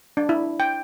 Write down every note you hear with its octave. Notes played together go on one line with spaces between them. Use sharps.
D4
E4
G5